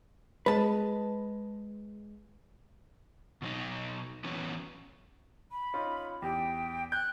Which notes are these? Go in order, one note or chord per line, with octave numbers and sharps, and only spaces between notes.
G#3 B4 A5
B2 F#3 D#4
E3 F#3 B3 C#4
B5
C#4 D#4 F4
E2 G4 G5
F#6 G6